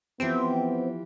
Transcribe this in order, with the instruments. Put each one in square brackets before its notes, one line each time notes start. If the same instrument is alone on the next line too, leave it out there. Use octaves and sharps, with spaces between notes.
[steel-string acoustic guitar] E3 F3 G4 [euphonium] B3 [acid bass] C4